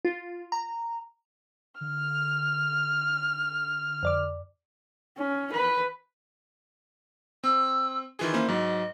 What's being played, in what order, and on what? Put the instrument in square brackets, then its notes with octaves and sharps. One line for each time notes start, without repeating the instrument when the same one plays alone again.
[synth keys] F4
A#5
[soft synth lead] D3 [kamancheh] F6
[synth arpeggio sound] F2 D5 D6
[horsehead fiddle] C#4
B4
[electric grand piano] C4 [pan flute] E6
[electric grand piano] D#3 E3 G#4 [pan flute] F4
[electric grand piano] A#3 E4 C5 [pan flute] C#4
[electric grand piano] G#2 F#3 [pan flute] D#5